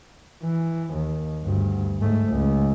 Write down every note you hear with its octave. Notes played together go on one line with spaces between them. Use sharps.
E3
D#2
D2 G2
G#2 A3
C#2